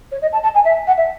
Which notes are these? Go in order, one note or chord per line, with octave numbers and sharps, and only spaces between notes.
C#5
D#5
A5
A5
G#5
E5
F#5
E5